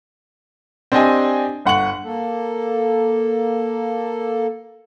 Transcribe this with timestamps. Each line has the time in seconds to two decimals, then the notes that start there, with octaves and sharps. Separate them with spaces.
0.92 C4 D4 G4 D#5 G5 G#5
1.65 G1 F#5 C#6 F#7
2.04 A#3 A4